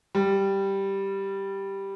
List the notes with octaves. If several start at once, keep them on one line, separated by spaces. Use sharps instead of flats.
G3